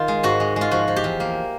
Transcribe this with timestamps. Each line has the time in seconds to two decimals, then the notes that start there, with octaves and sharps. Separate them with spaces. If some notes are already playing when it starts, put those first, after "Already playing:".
Already playing: D#3 F4
0.08 G#3
0.23 G#2 F#4
0.40 G#3
0.56 G#3 F4
0.71 F3 F#4
0.88 F3
0.96 G4
1.04 E2
1.20 A#3